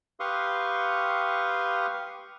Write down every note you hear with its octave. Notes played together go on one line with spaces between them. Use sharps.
G4 B4 F5 C6 C#6 D#6